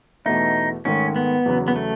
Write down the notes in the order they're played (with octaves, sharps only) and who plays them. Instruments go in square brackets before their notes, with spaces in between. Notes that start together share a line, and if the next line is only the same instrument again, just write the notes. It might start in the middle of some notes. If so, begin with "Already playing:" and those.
[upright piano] E2 B2 A3 E4 [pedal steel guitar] D#4
[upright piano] G#2 D#3 A3 [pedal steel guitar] C#4
[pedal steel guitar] B3
[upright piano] E2 C#3 F#3
[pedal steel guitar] B3
A3